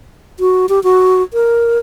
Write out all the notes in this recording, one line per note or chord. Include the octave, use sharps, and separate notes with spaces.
F#4
G4
F#4
A#4